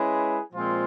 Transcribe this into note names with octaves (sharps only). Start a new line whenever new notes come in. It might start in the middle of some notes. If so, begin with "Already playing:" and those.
Already playing: G#3 C#4 E4 G#4 B4
A#2 F3 G#3 C4 F4